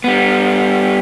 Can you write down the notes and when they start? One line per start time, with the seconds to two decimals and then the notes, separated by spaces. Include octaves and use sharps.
0.04 G3 B3